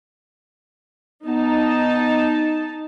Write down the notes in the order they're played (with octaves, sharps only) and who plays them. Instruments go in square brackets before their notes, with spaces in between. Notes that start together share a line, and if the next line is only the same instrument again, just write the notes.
[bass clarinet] B3 [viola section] D#4 A5